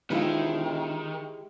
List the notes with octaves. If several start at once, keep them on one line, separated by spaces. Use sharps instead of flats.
E1 D#3 G#3 B3 E4 F4 G4